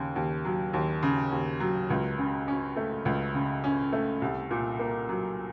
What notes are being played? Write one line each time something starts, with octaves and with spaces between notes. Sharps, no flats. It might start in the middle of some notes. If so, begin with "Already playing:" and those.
Already playing: D#2 C#3
D#2
F#3
D#2
C#3
D#2
F#3
C#2
C#3
C#4
A3
C#2
C#3
C#4
A3
C2
A#2
A#3
F#3